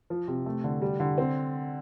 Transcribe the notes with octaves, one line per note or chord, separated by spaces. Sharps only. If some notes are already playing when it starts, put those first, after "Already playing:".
F3
C3
A3
D3
G3
D3
C4